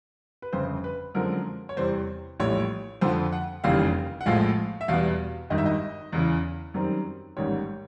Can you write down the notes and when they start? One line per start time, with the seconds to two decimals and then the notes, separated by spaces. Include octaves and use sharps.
0.42 B4
0.53 G1 F2 C#3 C5
0.84 B4
1.15 F#2 D3 F3 G#3 C4 A#4
1.69 C#5
1.77 E2 C3 E3 G3 C4 C5
2.40 A#1 A2 E3 G3 C#5
3.01 F2 D3 F3 C5
3.32 F#5
3.64 F1 D#2 C#3 E3 G3 F5
4.21 F#5
4.26 A#1 A2 F3 G#3 F5
4.81 E5
4.88 E2 B2 G3 B3 F5
5.50 G#1 G2 D#3 D#5
5.58 E5
5.66 D#5
6.12 E2 C#3 E3
6.74 F#2 D#3 G3 C4
7.37 A1 G#2 D#3 G3 C#5